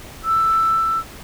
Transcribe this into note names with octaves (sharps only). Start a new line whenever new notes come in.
E6